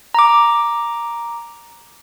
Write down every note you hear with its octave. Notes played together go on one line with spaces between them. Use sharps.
A#5 D6